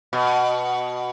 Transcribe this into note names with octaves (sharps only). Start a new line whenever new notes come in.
B2